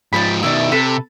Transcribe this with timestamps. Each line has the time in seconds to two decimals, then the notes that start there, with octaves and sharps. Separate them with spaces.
0.13 G#2 F3 D5 G5 B5
0.43 B2 D#3 E4 D5
0.72 C3 A4 B4 B5